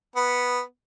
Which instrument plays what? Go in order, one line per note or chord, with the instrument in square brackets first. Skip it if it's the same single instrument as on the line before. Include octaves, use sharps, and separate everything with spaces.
[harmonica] B3